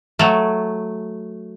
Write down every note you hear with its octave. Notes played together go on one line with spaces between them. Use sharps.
F#3 A3